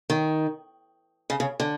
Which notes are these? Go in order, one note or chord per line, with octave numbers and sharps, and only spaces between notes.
D#3
C#3
C#3
D3